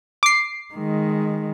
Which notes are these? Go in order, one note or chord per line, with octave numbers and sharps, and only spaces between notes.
D6 C7
D#3 G#3